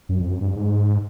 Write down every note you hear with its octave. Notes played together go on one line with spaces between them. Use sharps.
F#2
F2
F#2
G2
G#2